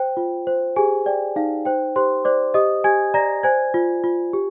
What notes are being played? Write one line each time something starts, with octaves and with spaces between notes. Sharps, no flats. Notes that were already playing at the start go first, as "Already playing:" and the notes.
Already playing: C5 G5
F4
C5
G4 G#4 G#5
D5 G5
D#4 F5
C5 G5
G4 C5 C6
C5 D5 D6
G4 D#5 D#6
G4 G#5 G#6
D5 A#5 A#6
C5 G#5 G#6
F4
F4
G4